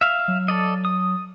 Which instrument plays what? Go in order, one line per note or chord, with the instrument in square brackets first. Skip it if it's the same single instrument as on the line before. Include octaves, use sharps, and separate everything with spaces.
[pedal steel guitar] E5 F5
[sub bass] F#3
[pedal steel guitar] A4 D5 D#5
D#6